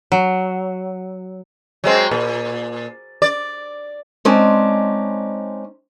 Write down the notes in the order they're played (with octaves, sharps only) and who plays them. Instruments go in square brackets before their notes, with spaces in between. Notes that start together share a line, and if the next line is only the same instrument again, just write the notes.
[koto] F#3
[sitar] F#3 G#3 C4
A#2
D5
[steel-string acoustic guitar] G#3 C4 C#4 D#4 D5 A5